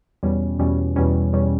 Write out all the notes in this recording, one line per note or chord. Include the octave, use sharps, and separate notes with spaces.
E2 B2 G3 C#4
E2 B2 G3 C#4
E2 B2 G3 C#4
E2 B2 G3 C#4